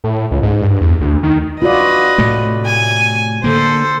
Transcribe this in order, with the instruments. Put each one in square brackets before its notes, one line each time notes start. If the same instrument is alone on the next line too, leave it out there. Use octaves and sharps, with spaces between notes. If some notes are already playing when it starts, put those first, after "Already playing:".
[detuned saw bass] A2
C#2
G#2
G2
E2
D2
D#3
[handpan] F4 F#4 D5 [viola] B4 D#5
[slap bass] A2 C3 A3
[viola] G#5
[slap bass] D3 A#3 [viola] A4 C5